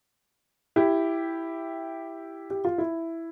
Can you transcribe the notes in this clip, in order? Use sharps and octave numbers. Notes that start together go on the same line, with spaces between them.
E4 G4
G4
F4
E4